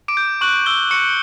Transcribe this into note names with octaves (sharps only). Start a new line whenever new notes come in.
D6 D7
G6
C#6 F#6 F#7
E6 G6 G7
C#6 C#7